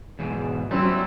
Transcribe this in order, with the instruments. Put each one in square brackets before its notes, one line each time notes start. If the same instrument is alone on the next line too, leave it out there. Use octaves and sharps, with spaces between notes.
[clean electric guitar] E2 G#2 B2
[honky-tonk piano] F#3 C#4 [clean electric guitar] G3 E4 [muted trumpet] C4